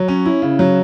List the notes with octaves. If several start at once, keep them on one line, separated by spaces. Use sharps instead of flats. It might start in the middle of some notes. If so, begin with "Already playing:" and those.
Already playing: F#3
C#4
E4
C#3
F#3